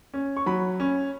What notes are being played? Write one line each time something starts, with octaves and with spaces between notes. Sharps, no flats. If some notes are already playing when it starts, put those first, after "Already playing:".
C#4
C#6
F#3 B5
C#4